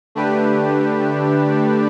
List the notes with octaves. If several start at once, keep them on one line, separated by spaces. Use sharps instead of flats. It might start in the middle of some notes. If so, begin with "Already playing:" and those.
D3 A3 D4 G4 B4